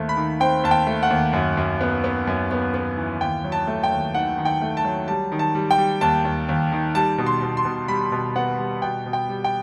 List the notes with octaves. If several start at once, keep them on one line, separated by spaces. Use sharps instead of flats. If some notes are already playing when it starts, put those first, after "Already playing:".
Already playing: D#2 A3 C4
B5
D#3
C4 G5
D#2 A5
G5
A3
F#5
D#2
F#2
F#2
B3
B3
F#2
B3
B3
E3
D#2 G5
F#3
A5
A3
G5
D#2
D#3 F#5
D#3
G5
A3
A5
F#3
G3 A5
D#3
A5
G3
G5
G3
D#2 A5
D#2
D#2
D#3
G3 A5
B2
C6
B2
C6
B2
G3 B5
B2
B3 F#5
G3
B2 G5
B2
G5
G3
G5